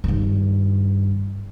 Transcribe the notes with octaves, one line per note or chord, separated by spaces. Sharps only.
G2 D#3